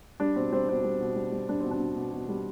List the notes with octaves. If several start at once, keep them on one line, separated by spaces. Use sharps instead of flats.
G3 D4
B2 C4
G3 C4
B2 C4
G3
B2
G3
G3
G3 D4
B2 C4
D4
B2
B2
B2
G3